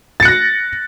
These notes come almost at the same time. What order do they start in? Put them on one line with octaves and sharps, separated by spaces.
A6 C#7 F#6 A#6